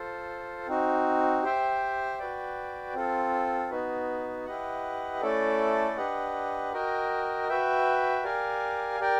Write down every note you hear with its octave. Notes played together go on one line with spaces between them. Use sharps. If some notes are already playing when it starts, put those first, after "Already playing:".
Already playing: F4 A4 C5
C4 D#4 F#4
G4 C5 E5 G5
F#4 B4 D5 G5
C4 F4 A4
B3 D#4 F#4 B4
E4 G4 B4 D#5 F#5
A3 C#4 E4 A4 D5
D4 G4 B4 D#5 F#5
F#4 A#4 D#5 G5
F#4 B4 E5 G5
G4 A#4 D5 F5 G#5
G4 A#4 D5 G5